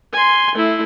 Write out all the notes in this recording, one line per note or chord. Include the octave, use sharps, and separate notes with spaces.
G#5 C6
A3 E4